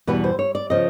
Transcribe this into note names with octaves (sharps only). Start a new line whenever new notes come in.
E2 B2 G3 B4
C5
C#5
D5
C#3 F3 D#5